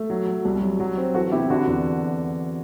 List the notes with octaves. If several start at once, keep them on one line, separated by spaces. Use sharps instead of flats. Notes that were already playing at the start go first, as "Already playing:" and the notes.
Already playing: A3
F#3
F#3
C2
F#3
F#3
C4
E3 F#4 A4
C3 E4 G4
D3 D4 F#4
E2